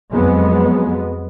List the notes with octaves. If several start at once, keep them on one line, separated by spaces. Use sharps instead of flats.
F2 F#3 G#3 B3